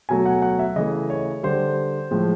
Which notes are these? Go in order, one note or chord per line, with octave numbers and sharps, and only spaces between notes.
B2 F#3 A3 G#5
F#5
F#5
E5
C#3 E3 A3 D#5
C#5
D3 G3 C5
A2 F3 G#3